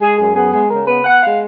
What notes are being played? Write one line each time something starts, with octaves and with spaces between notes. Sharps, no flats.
G#3 G#4
F#2 G#4
B3 G#4
G#3 G#4
C#3 A#4
B3 B4
B3 F#5
G#3 F5